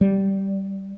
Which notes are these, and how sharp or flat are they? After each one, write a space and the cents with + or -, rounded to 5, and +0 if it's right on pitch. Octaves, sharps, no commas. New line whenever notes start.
G3 -10